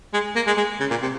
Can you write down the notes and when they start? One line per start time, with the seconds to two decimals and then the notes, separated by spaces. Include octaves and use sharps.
0.13 G#3
0.36 A#3
0.47 G#3
0.57 G#3
0.80 C#3
0.90 A#2
1.02 C3